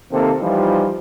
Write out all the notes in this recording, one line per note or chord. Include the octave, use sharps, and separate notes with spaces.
C3 D#3 A#3 C4 A4
E3 F3 G3 D#4 F4